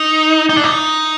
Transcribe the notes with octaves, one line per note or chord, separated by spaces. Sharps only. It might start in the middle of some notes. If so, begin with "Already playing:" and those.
Already playing: D#4
D#4
D4
D#4